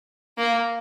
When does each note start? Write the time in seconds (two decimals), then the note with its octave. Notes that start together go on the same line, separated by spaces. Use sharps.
0.38 A#3